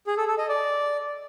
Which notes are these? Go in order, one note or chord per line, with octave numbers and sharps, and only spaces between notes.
G#4
A4
A4
D#5
D5